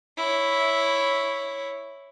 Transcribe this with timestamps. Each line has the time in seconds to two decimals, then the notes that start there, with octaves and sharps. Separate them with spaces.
0.18 E4 C#5